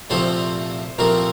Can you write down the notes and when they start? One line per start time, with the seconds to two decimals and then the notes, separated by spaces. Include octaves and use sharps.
0.10 C2 A#2 F3 A3 C4 C5
0.98 C2 A#2 F3 A3 C4 A#4